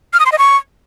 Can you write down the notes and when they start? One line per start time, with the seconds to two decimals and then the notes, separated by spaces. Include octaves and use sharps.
0.13 F6
0.20 D#6
0.26 C6
0.32 D#5
0.38 C#6